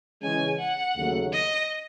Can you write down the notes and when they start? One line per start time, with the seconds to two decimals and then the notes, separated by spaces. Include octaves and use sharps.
0.22 C#3 E3 G#3 C#4 G#5
0.59 F#5
0.96 D#2 C#3 F#3 A3
1.33 D#5